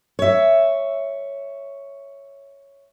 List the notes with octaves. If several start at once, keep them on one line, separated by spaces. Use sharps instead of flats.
C#5 E5